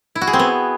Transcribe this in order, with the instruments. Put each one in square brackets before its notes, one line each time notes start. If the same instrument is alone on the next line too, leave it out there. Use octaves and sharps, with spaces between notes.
[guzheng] E4
F#4
G#4
C4
B3